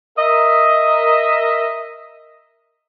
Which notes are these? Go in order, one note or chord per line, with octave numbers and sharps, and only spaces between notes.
A#4 D#5 E5